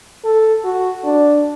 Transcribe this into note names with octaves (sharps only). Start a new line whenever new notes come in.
A4
F#4
D4